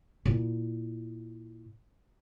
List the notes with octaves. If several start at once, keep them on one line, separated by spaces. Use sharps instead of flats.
A#2 E4